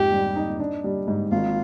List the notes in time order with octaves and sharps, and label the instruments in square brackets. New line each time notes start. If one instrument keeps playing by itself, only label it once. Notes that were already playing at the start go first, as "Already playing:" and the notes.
Already playing: [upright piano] F2 G#2 [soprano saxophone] G4
[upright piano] G3
D#4
D4
G3
G#2
[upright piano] G#1 [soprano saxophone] F4